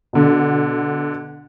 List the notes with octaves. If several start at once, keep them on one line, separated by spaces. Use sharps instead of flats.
B2 D3